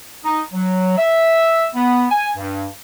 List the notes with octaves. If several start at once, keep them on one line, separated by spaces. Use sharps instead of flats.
D#4
F#3
E5
B3
G#5
G2